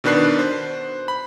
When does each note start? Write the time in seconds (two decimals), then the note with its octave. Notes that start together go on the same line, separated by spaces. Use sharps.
0.04 B2 D#3 D4 B4 F#6 C7
0.39 C5
1.08 B5